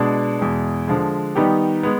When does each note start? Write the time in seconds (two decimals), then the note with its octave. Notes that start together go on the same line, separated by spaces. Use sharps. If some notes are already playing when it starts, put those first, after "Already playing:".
Already playing: B2 G#3 B3 D4
0.39 E2 B2 G#3
0.87 D3 F3 G#3
1.35 D#3 G3 B3 D#4 G4
1.83 G#3 B3